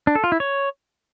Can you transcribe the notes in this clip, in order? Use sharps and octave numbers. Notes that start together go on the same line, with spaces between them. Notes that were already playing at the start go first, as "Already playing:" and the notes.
D4
A4
F4
E4
C#5